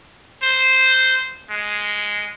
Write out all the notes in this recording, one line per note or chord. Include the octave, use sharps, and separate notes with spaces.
C5
G#3